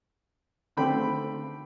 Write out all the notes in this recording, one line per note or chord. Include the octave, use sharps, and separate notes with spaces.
D3 A3 C4 G5 B5